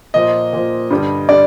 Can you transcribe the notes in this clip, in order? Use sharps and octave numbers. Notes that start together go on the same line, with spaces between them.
A#2 F3 D#5
A#2 F3
G2 D3 G3
D3 G3 D5